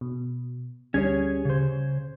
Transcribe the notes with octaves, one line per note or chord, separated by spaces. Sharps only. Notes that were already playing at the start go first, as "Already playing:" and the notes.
B2
D2 G3 C#4 G#4 C#5 G#6
C#3 C5